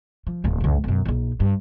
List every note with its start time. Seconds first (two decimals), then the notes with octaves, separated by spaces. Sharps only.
0.27 F3
0.44 D1 A#3
0.61 C#2 F#2
0.84 B1 F#2
1.05 A#1 D#4
1.40 G2